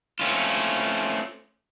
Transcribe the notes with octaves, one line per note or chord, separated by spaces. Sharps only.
A3 C4 C#4 F4